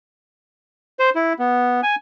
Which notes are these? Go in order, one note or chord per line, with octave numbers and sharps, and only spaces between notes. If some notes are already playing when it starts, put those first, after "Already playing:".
C5
E4
B3
G#5